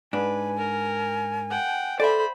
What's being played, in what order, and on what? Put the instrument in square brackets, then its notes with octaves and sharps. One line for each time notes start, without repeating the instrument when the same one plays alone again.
[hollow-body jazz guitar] G#2 D4 [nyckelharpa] B4 [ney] G#5
[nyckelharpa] A#4
F#5 G5
[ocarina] A4 [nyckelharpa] C5 B5 [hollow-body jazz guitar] D5 E5